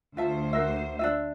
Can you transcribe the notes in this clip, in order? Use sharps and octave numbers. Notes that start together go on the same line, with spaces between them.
D2 F4 C5 E5 A5
F#4 A#4 E5
D4 F4 E5